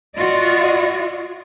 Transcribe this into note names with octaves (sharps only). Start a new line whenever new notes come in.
F4 F#4 D5 D#5